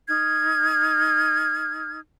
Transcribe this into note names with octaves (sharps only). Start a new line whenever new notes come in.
D#4 F6 G#6